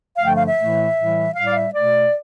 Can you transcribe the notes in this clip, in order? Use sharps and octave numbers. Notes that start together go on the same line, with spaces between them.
G2 D3 F3 A3 F5
G5
F5
E5
A2 E3 A3
A2 E3 G3
A2 G3 F5
D5
E5
B2 A3 D5